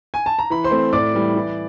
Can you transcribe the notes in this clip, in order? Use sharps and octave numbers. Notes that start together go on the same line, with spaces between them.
G#5
A5
A#5
E3 B5
C5 C6
A3 C4
A2 D5 D6
E3 G3
E3